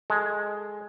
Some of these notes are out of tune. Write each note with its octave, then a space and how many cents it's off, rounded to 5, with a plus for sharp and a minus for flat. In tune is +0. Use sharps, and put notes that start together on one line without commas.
G#3 +0 A4 +0